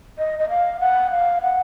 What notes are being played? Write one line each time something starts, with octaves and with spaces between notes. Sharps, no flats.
D#5
D#5
F5
F#5
F5
F#5